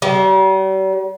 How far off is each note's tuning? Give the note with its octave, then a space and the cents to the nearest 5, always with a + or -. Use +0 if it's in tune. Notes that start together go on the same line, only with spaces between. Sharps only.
G3 -45